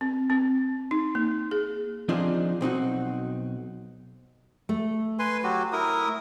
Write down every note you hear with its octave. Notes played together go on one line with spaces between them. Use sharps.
C4
C4
D#4
A#3
G#4
F3 C4 D4 D#4 F4 G#4
B1 C4 D#4 F#4
A3
B4 G#5 C6
F#3 F#4 G4
E4 A#4 D#6